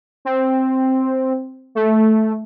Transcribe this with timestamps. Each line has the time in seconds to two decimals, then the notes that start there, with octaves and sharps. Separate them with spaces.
0.25 C4
1.75 A3